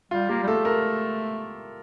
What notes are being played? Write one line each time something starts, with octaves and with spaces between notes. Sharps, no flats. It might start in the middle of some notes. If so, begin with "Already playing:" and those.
G3 F4
A#3 G4
G3
A3 A4
A#4